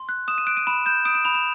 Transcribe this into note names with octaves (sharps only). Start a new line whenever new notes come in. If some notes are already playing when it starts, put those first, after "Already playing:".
Already playing: C6
F#6
D#6 E7
D#7
F#6 D7
D#7
B5 E7
G6 E7
D#6 D7
E7
B5 F7
E7